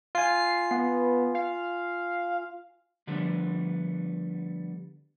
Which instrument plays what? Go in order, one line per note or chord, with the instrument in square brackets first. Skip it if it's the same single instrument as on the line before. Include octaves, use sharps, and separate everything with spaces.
[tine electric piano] F4 G#5 [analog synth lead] C7
[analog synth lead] B3
F5
[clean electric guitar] D3 F3 G3 A3 B3 D4